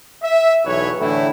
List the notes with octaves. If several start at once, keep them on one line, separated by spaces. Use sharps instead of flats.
E5
B1 E2 B4 C#5
A2 D3 E3 A3 E4